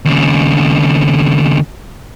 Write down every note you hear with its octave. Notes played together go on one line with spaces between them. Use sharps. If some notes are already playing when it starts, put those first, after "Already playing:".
D#2 C#3